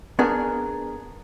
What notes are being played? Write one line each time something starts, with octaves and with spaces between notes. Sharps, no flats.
B3 D4 G#4 A#4